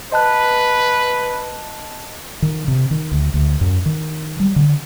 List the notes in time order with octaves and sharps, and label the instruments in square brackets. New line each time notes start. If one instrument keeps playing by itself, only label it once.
[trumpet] B4 [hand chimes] D#5 A5 F#6
[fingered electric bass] D#3
C3
D#3
D2
D2
F#2
D#3
G3
D3